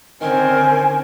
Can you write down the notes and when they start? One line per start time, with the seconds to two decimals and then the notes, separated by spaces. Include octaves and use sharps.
0.21 D3 D#3 C4 C#4 A#4 G#5